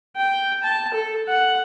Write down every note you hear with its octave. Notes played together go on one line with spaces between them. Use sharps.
G5
A5
A4
F#5